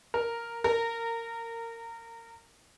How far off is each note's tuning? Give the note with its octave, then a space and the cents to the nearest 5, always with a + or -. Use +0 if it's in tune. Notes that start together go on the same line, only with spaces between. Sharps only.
A#4 -5
A#4 -20